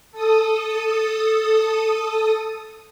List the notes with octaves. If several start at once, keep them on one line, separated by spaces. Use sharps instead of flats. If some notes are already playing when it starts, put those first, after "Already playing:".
A4 D#6